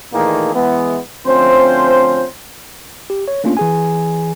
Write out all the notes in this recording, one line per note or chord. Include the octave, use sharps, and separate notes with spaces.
A#2 D#3 E3 A3 A#3 G#4
E3 G#3 B3
D2 F3 C4 C#4 C5
G4
C#5
A3 A#3 C#4 D4 F4
E3 G#4 G#5